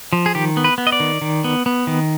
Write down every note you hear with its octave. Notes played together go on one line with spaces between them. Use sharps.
F3
G#4
D#3 G4
B3
B4
B3
D#5
D5
D#3
D#3
B3
B3
D#3